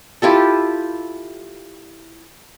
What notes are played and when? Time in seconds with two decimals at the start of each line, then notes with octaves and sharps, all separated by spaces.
0.22 E4 F4 G4 A4